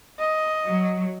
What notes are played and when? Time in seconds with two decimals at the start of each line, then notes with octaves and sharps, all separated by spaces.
0.19 D#5
0.67 F#3